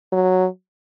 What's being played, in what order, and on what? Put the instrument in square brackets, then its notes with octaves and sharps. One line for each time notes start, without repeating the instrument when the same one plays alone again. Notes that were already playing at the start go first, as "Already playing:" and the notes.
[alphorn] F#3